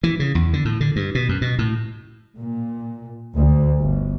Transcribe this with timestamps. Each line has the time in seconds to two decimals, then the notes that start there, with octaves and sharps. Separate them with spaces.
0.03 E3
0.20 C#3
0.35 E2
0.53 D3
0.65 A2
0.80 D3
0.96 G2
1.15 B2
1.29 F#2
1.41 B2
1.59 A2
2.38 A#2
3.37 D2
3.80 G1